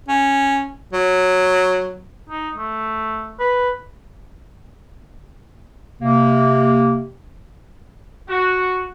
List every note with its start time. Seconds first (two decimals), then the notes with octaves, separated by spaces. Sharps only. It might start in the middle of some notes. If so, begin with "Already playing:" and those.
0.08 C#4
0.93 F#3
2.29 D#4
2.56 A3
3.40 B4
6.01 C3 A#3
8.30 F#4